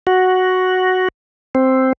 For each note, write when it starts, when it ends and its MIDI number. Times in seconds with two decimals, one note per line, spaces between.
0.07 1.08 66
1.55 1.93 60